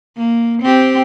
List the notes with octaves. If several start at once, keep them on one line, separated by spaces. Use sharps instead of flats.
A#3
C4 G4